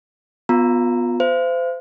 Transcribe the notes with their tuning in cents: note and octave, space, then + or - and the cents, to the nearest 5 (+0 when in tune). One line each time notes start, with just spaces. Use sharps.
B3 +0 F4 +25 A#5 -5
C5 -30 F5 -40